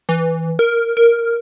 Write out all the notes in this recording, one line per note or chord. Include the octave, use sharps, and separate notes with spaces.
E3
A#4
A#4